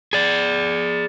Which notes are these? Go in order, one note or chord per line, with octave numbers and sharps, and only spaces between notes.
G#4 D5